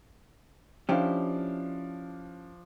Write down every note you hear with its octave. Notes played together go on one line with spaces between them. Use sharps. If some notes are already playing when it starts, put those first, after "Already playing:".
F3 C#4 D4 E4 G4 F5